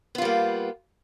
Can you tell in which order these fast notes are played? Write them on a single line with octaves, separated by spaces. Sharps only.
B3 F4 G3 A#3